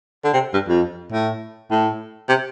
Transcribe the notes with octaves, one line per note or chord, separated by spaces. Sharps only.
D3
C3
G2
F2
A2
A2
C3